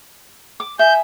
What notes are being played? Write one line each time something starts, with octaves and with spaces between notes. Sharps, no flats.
D6
E5 G#5 G6